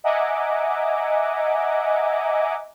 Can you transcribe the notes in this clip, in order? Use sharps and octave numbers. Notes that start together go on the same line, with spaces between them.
D#5 E5 F#5 G#5 A#5 D6